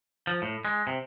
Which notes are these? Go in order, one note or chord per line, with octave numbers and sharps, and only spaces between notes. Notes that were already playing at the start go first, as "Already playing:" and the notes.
F3
A2
G#3
C3